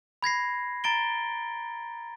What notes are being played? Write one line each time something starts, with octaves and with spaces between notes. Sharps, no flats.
B5 G#6 A#6 C7
A#5 A6 D7 G7